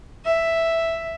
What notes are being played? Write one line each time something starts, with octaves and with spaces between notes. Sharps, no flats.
E5